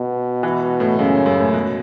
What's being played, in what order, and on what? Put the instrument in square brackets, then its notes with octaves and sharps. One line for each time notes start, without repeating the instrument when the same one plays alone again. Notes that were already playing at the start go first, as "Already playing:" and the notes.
Already playing: [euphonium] B2
[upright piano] E3
A2
[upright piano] F#2 [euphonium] C#3
[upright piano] F#2
A2
B2